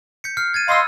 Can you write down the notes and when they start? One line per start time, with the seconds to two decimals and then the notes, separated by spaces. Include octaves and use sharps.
0.24 G6 B6 C#7
0.37 F6 C7
0.54 G#6 A6 D#7
0.68 D#5 F5 B5 C6 D#6 E6